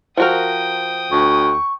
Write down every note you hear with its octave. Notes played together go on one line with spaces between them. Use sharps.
F3 F#4 A#4 G5 D#6
D2 C#6